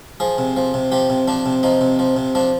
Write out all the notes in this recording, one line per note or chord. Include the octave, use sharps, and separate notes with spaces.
F3 G#4
C3
F3
C3
F3 G4
C3
F3 D4
C3
F3 D#4
C3
F3
C3
F3 D4